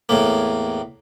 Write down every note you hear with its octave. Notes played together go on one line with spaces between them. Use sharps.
E2 A2 A#3